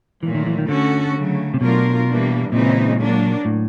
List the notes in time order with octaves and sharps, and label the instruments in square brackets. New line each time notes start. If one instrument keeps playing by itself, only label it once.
[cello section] A#2 F#3 A3 [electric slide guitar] E3
[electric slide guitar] D#3
E3
D#3
[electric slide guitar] D3 [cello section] A3 C#4 F#4 A4
[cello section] C#3 F#3 A3
[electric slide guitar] C3
[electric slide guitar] B2 [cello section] F#3 A3 D4 F4 A#4
[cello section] E3 G3 A#3 D4
[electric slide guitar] A#2 [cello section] C#3 E3 G#3 C4 D#4
[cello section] F#3 A#3 D4
[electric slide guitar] A2